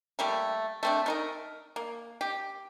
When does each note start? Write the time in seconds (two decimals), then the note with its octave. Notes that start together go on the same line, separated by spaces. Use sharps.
0.19 G3 A3 A#3
0.83 A3 C4 D4
1.06 A3 D#4 A#4
1.76 A#3
2.21 G4